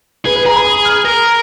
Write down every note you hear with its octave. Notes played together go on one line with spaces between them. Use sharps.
G#4 B4
B4
G#4 A#5
B5
D#6
F6
A#4